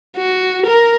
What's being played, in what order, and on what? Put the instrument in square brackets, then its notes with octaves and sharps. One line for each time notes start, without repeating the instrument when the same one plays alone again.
[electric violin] F#4
A#4